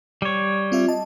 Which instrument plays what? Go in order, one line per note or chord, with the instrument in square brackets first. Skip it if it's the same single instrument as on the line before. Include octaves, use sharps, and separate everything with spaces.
[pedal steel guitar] G3 C#5
[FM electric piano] C4 F4 E5
D#5 A5